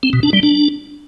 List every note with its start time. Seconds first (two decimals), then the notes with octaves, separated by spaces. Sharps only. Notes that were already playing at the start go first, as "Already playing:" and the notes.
0.03 C4
0.13 B2
0.23 D4
0.33 G3
0.43 D4